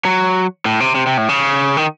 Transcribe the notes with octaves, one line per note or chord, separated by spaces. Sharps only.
F#3
A2
C3
C3
C3
A2
C#3
D#3